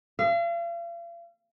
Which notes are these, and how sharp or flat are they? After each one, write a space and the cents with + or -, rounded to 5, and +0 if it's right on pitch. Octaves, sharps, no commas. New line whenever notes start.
F5 -40